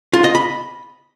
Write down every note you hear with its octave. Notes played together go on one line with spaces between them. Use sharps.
F4
D#5
B5